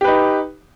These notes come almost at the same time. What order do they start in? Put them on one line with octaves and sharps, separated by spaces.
G4 B4 D#4